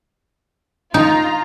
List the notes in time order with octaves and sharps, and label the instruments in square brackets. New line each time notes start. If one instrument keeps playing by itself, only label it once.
[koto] D#4 [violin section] F4 A#5